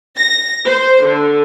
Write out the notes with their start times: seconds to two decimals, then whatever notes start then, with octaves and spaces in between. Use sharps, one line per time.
0.17 A#6
0.67 C5
1.06 D3